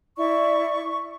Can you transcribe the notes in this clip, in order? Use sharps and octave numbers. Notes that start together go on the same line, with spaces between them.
E4 D5 C#6